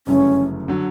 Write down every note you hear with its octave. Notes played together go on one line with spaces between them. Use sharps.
G1 F#2 C#3 E3 A3 C#4
D3 F#3